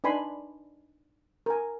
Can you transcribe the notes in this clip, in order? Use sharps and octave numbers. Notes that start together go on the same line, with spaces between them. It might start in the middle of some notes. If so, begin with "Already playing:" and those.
D4 D#4 B4 G#5 B5 C6
A#4 G#5